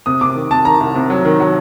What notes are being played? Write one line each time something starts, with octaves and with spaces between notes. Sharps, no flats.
C3 D#6
C3 D6
D#3
C3 A5
D#3 A#5
C2
C3
F#3
D#3
F#3